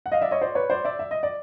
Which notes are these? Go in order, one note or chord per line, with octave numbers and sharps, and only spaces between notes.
F#5
D#5 F5
D5 E5
C#5 D#5
C5 D5
B4 C#5
C5 D5
D5 E5
E5
D#5
D5